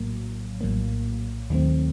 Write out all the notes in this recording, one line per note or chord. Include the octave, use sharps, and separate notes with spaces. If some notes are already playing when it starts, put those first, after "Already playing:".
Already playing: A#1 A2 F#3 A#3
A#1 A2 F#3 A#3
D#2 D#3 F#3 A3 C4